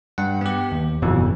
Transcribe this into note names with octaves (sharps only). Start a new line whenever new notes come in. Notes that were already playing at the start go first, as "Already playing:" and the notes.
G2 F#5
B3 G4
D#2
G1 F2 B2 E3